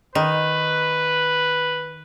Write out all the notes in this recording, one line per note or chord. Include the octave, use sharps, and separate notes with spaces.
D#3 B4